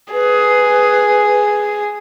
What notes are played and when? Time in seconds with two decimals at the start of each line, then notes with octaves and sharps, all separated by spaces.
0.13 G#4 B4